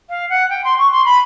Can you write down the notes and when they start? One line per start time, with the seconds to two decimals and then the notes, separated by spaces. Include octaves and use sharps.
0.09 F5
0.29 F#5
0.49 G5
0.64 C6
0.78 C#6
0.91 C6
1.05 B5